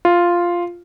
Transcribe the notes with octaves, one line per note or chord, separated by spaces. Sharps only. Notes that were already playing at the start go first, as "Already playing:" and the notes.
F4